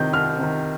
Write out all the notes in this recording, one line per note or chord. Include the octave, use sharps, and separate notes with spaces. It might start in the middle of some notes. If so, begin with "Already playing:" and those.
Already playing: C3 D#3 G6
C2 F6
C3 D#3